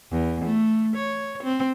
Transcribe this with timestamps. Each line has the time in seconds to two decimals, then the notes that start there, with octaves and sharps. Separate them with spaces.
0.11 E2
0.45 A3
0.96 C#5
1.43 C4